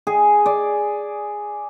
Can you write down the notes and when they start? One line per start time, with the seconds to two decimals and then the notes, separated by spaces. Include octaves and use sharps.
0.07 G#4
0.46 D5